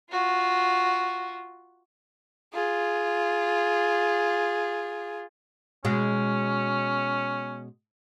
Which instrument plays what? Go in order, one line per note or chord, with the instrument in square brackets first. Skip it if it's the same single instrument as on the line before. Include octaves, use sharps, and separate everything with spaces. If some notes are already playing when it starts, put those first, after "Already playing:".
[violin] F4 F#4
[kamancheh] F4 G#4
[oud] B2 G#3 [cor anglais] C#4